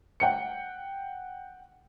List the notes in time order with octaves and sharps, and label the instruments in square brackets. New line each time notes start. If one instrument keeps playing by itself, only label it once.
[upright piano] F#5 G5 C#7